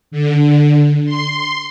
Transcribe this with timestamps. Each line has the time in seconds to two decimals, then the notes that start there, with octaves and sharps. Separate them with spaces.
0.11 D3
1.06 C6